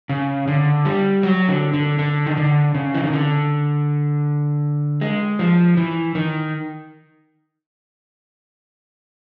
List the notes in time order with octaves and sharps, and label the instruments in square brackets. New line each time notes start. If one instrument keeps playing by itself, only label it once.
[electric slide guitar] C#3
D3
G3
F#3
D3
D3
D3
D#3
D3
C#3
E3
D#3
D3
G#3
F3
E3
D#3